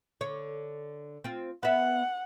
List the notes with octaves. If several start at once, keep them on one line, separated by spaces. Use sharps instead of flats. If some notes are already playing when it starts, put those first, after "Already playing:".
D3 C#5
C4 F4
B3 E5 F#5